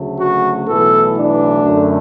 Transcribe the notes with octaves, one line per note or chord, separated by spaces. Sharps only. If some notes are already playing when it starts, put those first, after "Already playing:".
Already playing: D2 C#3 F#3 A3
F#4
B1 A2 E3 B3 A4
D4
F#2 D3 A3